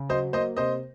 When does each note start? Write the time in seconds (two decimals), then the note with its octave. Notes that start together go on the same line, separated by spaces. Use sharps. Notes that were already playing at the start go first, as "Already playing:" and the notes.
Already playing: C#3
0.09 F#3 C5 D#5
0.33 A#3 C5 D#5
0.57 C3 C5 D#5